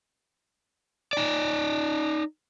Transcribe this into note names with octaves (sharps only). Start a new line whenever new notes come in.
D#4 D5